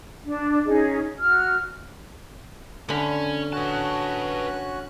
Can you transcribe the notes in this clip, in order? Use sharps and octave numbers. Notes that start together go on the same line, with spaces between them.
D4
C#4 D#4 G#4 D#5
F#4 F6
D3 C#4 B5
C#4 F#4 B4 A5 F#6